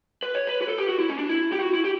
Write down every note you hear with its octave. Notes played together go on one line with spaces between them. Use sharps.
B4
C#5
B4
B4
A4
G4
F#4
E4
C#4
D4
E4
G4
F#4
E4
G4